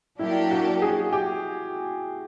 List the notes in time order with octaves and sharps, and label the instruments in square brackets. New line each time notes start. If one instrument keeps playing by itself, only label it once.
[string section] F#3 A#3 D4 G4 [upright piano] E4
[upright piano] F#4
G#4
G4